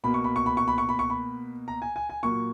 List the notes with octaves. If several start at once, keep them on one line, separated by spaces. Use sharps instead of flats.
B2 A#3 B5
C#6
B5
C#6
B5
C#6
B5
C#6
B5
C#6
B5
A#5
G#5
G#5
G#5
A#2 F#3 A#3 C#6